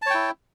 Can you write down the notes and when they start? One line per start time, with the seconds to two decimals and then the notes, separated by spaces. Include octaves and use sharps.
0.02 A5
0.06 C#5
0.10 G5
0.14 E4